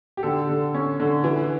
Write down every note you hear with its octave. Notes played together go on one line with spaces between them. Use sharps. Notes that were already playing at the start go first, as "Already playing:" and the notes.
G4
D3 A4
D3
C#4
D3
E3